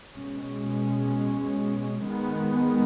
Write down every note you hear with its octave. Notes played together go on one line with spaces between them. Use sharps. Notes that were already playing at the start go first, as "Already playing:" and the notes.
B2 G#3 C#4
D#3 G#3 B3